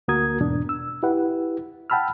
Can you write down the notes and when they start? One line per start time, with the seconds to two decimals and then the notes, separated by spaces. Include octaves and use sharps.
0.08 D2 A#3 F#4 A#4 D#6 G#6
0.41 E2 G#2 B2 D4
0.69 E6
1.03 E4 G4 B4 F#5
1.90 F#5 G5 A5 B5 E6 F6